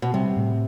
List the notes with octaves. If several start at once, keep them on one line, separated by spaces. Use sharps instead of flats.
B2
C3 G3
A2